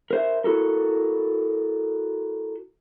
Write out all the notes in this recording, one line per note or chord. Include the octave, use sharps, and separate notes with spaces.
A#4 C5 E5
E4 F#4 A4 A#4